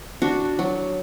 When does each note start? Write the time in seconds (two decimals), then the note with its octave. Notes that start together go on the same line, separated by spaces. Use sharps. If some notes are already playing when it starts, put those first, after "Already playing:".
0.22 D4 F#4
0.59 F#3